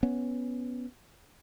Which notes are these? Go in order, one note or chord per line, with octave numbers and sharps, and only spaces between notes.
B3 C#4